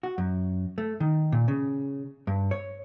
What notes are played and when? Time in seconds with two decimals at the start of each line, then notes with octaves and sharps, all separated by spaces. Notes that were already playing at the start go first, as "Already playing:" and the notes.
0.03 F#4
0.18 F#2
0.78 A3
1.00 D#3
1.32 A#2
1.48 C#3
2.27 G2
2.51 C#5